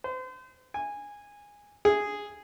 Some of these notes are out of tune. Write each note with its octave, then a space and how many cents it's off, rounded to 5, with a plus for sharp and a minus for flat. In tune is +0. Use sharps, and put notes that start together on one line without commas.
C5 -35
G#5 -15
G#4 -5